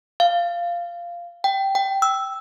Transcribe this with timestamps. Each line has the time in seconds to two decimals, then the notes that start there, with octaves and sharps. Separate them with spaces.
0.20 F5
1.44 G5
1.75 G5
2.02 E6